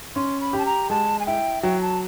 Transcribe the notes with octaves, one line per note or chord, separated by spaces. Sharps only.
C#4 C6
B5
G4
A5
A#5
G#3 A5
G#5
E4 G5
F#3 G5
A5